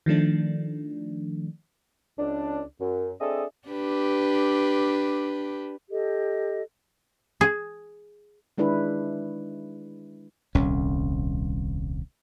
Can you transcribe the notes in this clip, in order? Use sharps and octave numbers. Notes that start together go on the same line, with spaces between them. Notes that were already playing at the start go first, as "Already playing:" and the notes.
D#3 F3 A3 D4
C#2 D4
F#2
C4 D4 G#4 A4 D#5 E5
D4 G4 B4
G4 A4 D#5
G#4
D#3 G#3 D4 E4 B4
D#1 C2 C#4